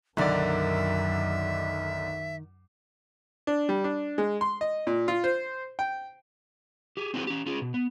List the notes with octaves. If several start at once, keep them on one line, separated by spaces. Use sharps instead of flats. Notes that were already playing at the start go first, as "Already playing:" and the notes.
B1 F#2 D3 D#3 A#4 D5 E5
D4
G3
D4
G#3
C6
D#5
A#2
F4
C5
G5
G4 G#4
C4 E4 F#4 G#4 B4
C#4 G4
C#4 F4 G#4
B2
B3